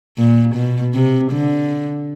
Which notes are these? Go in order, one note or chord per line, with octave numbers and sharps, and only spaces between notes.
A#2
B2
C3
D3